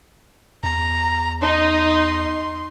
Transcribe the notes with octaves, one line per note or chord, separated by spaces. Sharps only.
E2 A#5
D#4 D#5 C6